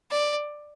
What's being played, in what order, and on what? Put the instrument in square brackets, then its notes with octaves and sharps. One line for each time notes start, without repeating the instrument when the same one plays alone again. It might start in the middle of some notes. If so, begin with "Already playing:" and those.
[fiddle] D5